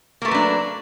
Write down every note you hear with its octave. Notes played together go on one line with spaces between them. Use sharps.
F#3 A3 A#3 D4 B4